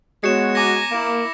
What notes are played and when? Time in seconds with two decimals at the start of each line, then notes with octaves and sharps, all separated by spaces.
0.24 G#3 B3 F#4 C#5 C#7 E7
0.55 G#5 A#5 D6 A#6
0.92 A#3 E4